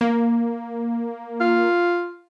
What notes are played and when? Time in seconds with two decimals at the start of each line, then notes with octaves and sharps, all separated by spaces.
0.01 A#3
1.40 F4